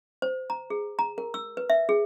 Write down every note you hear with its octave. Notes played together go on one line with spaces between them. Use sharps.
C5
A#5
G#4
A#5
A#4
E6
B4
E5
G#4